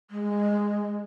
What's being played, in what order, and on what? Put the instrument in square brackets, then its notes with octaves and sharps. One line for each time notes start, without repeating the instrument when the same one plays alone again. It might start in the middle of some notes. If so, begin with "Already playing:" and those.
[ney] G#3